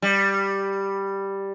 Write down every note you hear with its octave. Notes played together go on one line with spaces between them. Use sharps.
G3